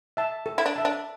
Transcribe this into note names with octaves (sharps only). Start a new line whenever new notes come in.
E5 A5
A4
E4
D4
E5 A5
D4